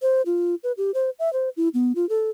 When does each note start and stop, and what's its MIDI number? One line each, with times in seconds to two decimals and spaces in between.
0.02 0.22 72
0.26 0.55 65
0.64 0.72 71
0.78 0.91 67
0.94 1.10 72
1.19 1.32 76
1.33 1.49 72
1.57 1.68 64
1.74 1.92 59
1.95 2.08 65
2.09 2.30 69